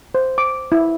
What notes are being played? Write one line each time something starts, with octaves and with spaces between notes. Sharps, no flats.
C5
D6
E4